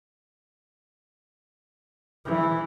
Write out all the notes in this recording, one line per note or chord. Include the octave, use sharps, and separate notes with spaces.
E3